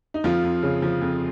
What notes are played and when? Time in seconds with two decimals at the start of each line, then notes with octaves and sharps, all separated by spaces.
0.14 D#4
0.24 F2 F3 F4
0.44 F2
0.63 C#3
0.82 F3
1.02 F2